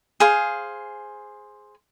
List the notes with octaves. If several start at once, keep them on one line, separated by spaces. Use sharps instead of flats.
G#4 C5 F5